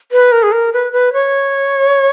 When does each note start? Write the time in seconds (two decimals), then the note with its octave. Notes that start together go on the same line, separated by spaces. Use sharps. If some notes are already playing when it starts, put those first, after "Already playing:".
0.12 B4
0.32 A#4
0.43 G#4
0.52 A#4
0.73 B4
0.93 B4
1.13 C#5